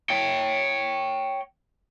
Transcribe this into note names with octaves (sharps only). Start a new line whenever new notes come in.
C#5 G5